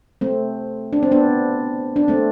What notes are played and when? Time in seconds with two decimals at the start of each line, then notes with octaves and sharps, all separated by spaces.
0.21 A3 C4
0.93 D4
1.03 C4
1.11 B3 D4
1.96 D4
2.08 A3 C4